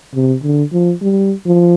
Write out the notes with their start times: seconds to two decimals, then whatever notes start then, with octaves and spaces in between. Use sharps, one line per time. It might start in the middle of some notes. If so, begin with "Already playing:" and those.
0.14 C3
0.43 D3
0.72 F3
1.02 G3
1.46 F3